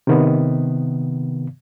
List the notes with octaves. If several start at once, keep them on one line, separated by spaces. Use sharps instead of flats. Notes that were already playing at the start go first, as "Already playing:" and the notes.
C3 D#3 B3